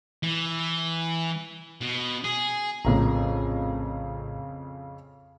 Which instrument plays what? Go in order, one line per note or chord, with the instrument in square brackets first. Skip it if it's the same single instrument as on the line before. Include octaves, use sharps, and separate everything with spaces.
[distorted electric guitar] E3
B2
G#4
[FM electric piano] A#1 A2 [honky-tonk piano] F2 C#3 A#5